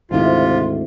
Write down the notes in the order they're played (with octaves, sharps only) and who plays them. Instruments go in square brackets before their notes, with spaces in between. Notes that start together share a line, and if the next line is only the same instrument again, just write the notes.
[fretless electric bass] D2 G#2 [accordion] C3 F4 [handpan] D#3 C4 E4